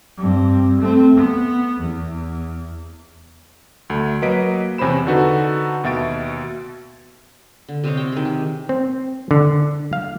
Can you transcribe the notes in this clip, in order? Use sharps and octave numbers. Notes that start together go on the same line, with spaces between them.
G2 C4
A3 C4
B3
E2
D2 A3
F#3 A#3 B4 D#5 B6 D7
E2 C3 C#4 C5 B5 E7
D3 D#4 F#4 A4 B4
D#2 B2 E5 A6 D7
D3
C3 C5 C#5 D#5
C5 G5
D#3 G#4
G4
C4
D3
F5